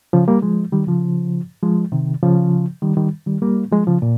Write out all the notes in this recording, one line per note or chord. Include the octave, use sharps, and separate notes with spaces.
C#3 F3
G3 A#3
F3 G#3
D#3 G3
C#3 F3
F3 G#3
C3 D#3
C#3 F3
D#3 G3
D#3 G3
D#3 G3
G3 A#3
F3 G#3
C#3 F3
A#2